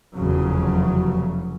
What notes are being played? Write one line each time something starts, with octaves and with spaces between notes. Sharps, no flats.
F1 E2 C#3 F#3